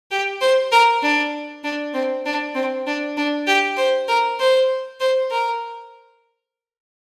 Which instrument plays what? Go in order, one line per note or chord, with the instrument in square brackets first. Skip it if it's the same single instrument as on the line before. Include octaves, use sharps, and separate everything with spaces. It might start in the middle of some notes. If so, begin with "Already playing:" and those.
[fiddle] G4
C5
A#4
D4
D4
C4
D4
C4
D4
D4
G4
C5
A#4
C5
C5
A#4